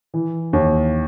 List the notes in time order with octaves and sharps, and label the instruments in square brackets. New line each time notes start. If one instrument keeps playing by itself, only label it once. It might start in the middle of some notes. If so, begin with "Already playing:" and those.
[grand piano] E3
D#2